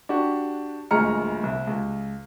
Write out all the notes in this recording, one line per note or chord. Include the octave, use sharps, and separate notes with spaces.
D4 F#4 G4
D#1 D2 G#3 A#5 F6 C#7
C2
C#2